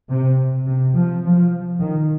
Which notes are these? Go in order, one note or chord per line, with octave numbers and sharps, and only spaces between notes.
C3
C3
F3
F3
D#3